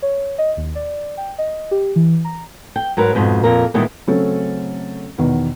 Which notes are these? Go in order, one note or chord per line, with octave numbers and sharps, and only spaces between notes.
C#5
D#5
D#2
D5
G5
D#5
G4
E3
A#5
G5
G#2 F#3 A#4 B4
F2 G#2 B2
F2 A#2 A#4
A#2 D#3 E3 G3 G#3 B3
C#3 F#3 A3 C4 C#4 A4
E2 B2 D#3